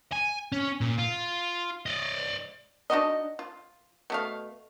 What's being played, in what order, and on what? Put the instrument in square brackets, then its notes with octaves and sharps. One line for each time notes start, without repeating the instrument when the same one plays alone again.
[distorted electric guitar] G#5
C#4
A#2
F4
D5 D#5
[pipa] D4 D#4 F#4 D#5
F4
B2 A3 F5